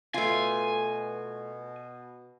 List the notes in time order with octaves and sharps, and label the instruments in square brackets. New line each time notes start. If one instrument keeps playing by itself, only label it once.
[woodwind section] B2 [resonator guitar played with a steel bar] A3 F4 [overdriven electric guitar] G#5